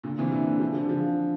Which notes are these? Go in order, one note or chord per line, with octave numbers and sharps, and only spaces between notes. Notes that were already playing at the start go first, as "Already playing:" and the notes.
A#2 D3
C3 E3
A#2 D3
D3 F3
D3 F3
D3 F3